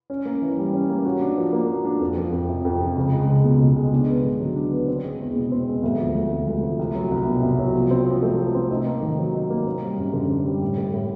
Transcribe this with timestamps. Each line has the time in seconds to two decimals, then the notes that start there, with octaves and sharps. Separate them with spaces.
0.10 C#4
0.25 A#3
0.42 E3
0.57 G3
0.73 C#4
0.89 A#3
1.05 F#4
1.21 D4
1.37 F3
1.53 A#3
1.69 F#4
1.85 D4
2.01 F2
2.17 F3
2.32 F2
2.49 C3
2.65 F2
2.80 F3
2.96 C#2
3.13 G#3
3.28 C#2
3.44 B2
3.60 C#2
3.76 G#3
3.93 D4
4.08 B3
4.24 D3
4.40 F#3
4.56 D4
4.72 B3
4.88 C4
5.04 G#3
5.19 E2
5.36 B2
5.52 C4
5.68 G#3
5.83 D2
5.99 F3
6.15 D2
6.31 C3
6.47 D2
6.63 F3
6.79 C2
6.95 F#3
7.11 C2
7.27 B2
7.43 C2
7.59 F#3
7.75 F3
7.91 C4
8.07 F3
8.22 A3
8.38 F3
8.55 C4
8.71 D#4
8.86 A#3
9.03 D#3
9.18 F#3
9.34 D#4
9.50 A#3
9.66 C4
9.82 G3
9.98 F#2
10.13 D3
10.30 C4
10.46 G3
10.62 A2
10.78 A3
10.94 A2